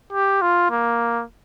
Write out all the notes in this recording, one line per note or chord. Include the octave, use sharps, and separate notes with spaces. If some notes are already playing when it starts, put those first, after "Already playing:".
G4
F4
A#3